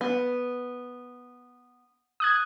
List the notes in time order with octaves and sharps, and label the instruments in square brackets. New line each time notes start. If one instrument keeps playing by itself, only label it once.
[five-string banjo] B3
[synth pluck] D#6 F#6 G#6